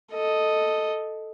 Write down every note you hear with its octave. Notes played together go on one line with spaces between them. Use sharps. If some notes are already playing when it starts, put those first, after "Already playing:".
A4 D#5